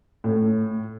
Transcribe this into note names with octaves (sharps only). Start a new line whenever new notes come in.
A2